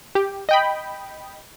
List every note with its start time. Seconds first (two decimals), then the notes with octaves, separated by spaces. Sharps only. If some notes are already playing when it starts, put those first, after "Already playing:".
0.15 G4
0.49 D#5 G5 B5